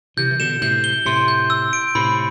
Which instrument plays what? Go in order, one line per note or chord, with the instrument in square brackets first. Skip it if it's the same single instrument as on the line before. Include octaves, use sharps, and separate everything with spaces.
[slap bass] C3 E3 [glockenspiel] G6
[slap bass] E3
[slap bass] B2 D3 [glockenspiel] E7
[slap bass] A2 C3 [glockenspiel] G6
[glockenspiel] G7
[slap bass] A2 C3 [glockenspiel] C6
[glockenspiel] G6
E6
D7
[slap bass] A2 C3 [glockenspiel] B5